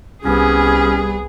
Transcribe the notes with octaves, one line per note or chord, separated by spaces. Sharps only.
C2 G3 B3 C#4 G#4